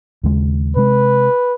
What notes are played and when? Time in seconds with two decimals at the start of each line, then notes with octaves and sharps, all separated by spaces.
0.23 D#2 C#3 G#3
0.76 C3 G#3 B4